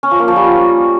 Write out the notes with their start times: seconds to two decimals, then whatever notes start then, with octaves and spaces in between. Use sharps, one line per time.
0.03 C#4
0.11 F3
0.20 A#3
0.28 F3
0.36 G3